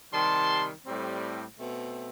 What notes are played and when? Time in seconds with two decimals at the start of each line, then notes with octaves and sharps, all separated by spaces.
0.13 C3 D#3 G3 A5 C6
0.86 A2 G3 C4
1.58 B2 A3 C4